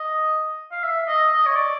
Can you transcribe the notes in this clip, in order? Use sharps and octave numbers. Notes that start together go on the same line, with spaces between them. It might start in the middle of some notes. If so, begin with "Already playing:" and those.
Already playing: D#5
F5
E5
D#5
D#5
C#5
D5